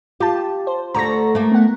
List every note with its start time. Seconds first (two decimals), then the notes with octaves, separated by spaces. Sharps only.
0.20 F4 G4 A5
0.67 C5
0.94 D2 D3 A#5 C#6 A#6
1.35 A3 A#3
1.52 B3 F#5